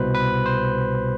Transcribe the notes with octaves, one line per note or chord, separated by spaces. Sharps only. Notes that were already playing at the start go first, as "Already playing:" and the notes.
Already playing: C2 B2 B4 C5
B4
C5